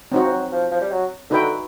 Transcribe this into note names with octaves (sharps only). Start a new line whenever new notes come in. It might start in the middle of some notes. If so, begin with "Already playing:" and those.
F#3 C4 D#4 F#4
F3
F#3
F3
F3
G3
F#3
D3 D#4 F#4 B4 E5 G5